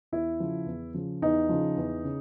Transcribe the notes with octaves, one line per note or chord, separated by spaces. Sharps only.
E2 E4
C#3 F3
E2
C#3 F3
E2 D#4
C#3 F3
E2
C#3